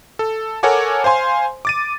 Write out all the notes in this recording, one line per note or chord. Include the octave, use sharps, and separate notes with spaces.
A4
A4 A#4 C#5 F#5 G#5 D6
C5 F5 G#5 C6
D6 A6 D#7